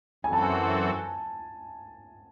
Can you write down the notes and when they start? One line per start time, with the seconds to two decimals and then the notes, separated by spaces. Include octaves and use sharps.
0.24 F#2 E3 C4 F#4 A4 G#5
0.33 A5
0.42 G#5